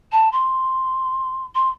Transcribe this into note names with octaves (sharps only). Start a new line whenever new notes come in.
A5
C6
C6